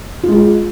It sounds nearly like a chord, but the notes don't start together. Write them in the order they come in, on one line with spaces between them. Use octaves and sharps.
F4 G#3 G#4